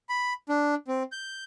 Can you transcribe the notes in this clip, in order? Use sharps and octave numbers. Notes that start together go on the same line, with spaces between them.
B5
D4
C4
G6